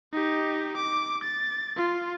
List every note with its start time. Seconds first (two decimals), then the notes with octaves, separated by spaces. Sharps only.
0.13 D#4 G4
0.76 D6
1.22 A6
1.76 F4